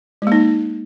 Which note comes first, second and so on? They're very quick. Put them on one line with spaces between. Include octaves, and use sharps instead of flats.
G#3 A#3 D#4